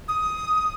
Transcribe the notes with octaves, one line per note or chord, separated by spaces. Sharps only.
D#6